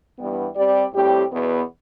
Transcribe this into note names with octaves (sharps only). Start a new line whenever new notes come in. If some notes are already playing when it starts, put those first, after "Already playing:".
G2 E3 G3 B3
G3 C4 G4 D5
A2 G3 C4 G4
E2 B2 B3